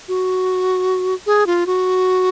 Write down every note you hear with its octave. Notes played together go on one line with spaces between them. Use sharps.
F#4
G#4
F4
F#4